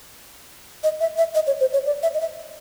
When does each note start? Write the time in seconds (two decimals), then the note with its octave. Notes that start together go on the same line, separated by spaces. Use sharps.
0.83 D#5
1.00 E5
1.18 E5
1.35 D#5
1.47 C#5
1.60 C5
1.73 C#5
1.86 D5
2.03 E5
2.14 D#5
2.20 E5